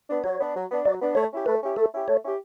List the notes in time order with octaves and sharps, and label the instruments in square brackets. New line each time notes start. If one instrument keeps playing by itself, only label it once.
[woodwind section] B3 D4
[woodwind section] F#3 [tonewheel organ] C#5
[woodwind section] B3 D4
F#3
B3 D4
[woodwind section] F#3 [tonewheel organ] D5
[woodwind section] B3 D4
[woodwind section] A3 [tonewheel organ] C#5
[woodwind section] C#4 E4 G4
[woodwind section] A3 [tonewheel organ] B4
[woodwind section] C#4 E4 G4
[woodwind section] A3 [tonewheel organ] A4
[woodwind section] C#4 E4 G4
[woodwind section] A3 [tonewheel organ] C#5
[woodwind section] C#4 E4 G4